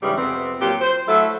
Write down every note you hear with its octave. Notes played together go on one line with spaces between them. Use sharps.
G#2 C#3 E3 G3
F2 C3 B3 C4
A#2 F#3 G4
C5
F#3 A3 E4 A4 E5